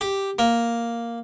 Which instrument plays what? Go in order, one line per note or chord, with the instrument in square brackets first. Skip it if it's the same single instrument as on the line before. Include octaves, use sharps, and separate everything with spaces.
[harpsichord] G4
A#3